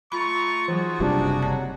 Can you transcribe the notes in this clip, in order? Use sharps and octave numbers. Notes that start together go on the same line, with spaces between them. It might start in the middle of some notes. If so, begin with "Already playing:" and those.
A3 F4 A#5 B5 C#6
E3 F#3 D#4 F#4 G#4
F#1 C3 G3 D4 F4
F#3 A5